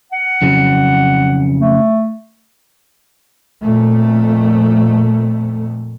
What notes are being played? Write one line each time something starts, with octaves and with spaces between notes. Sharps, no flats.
F#5
F2 C#3 F#3
A3
F2 A#2 A3